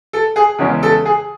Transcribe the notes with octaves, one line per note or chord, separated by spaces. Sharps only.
A4
G#4
E2 C#3 E3 G#3 C#4
A4
G#4